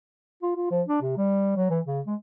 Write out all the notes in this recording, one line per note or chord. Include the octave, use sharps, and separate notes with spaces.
F4
F4
F3
D4
C3
G3
F#3
E3
C#3
G#3